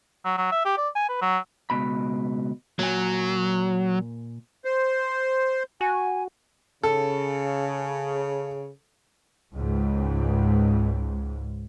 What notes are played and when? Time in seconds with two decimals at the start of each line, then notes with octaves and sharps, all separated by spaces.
0.25 F#3
0.37 F#3
0.52 E5
0.65 G4
0.77 D5
0.96 G#5
1.09 B4
1.22 F#3
1.70 C#2 B2 B5
2.79 A#2 F#3 G#5
4.65 C5
5.81 F#4 G#5
6.83 C#3 A4
9.53 C#2 G#2